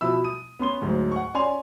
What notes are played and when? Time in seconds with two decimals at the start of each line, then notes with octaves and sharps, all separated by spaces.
0.01 B2 F3 E4 B5 E6
0.24 D#6 D#7
0.59 B3 C#4 C6 G7
0.82 D2 G#2 F#3
1.12 F#5 C#6
1.34 C#4 D5 G#5 C6 F7